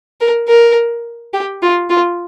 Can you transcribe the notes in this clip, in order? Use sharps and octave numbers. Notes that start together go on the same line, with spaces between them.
A#4
A#4
G4
F4
F4